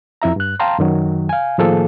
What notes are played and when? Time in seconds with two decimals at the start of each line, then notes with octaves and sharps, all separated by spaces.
0.22 F2 E4 E5 A#5
0.36 G2 F#6
0.60 F5 G5 A5 A#5 C6
0.79 F#2 D#3 F#3
1.29 F5 G#5
1.58 A2 D#3 F3 A#3 G#4 A4